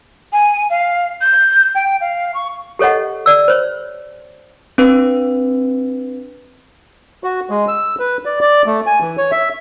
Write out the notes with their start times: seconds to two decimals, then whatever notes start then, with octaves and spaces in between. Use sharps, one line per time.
0.33 G#5
0.70 F5
1.21 G6
1.75 G5
2.01 F5
2.34 C#6
2.79 G4 A4 C#5 D#5 F#5
3.26 D5 E6
3.48 C5 C#5
4.78 C4 D4 B4
7.24 F#4
7.50 G#3
7.68 E6
7.99 B4
8.25 D5
8.41 D5
8.66 A3
8.87 G#5
9.02 E3
9.18 C#5
9.32 E5